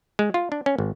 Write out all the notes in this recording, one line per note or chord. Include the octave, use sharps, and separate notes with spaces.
G#3
F4
D4
C#4
G#1